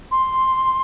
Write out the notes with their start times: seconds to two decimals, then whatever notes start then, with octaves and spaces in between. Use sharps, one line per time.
0.12 C6